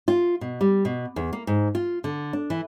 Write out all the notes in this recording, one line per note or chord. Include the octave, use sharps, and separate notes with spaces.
F4
B2
G3
B2
E2
A#3
G#2
F4
D3
D4
E3